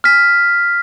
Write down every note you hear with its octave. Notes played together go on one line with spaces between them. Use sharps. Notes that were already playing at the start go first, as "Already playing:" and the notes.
F6 B6